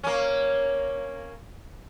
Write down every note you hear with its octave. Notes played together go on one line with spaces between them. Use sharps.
A#3 C#4